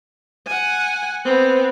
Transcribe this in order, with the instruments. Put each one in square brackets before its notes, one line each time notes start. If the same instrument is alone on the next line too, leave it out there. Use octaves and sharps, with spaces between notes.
[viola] F#5 G#5
B3 C4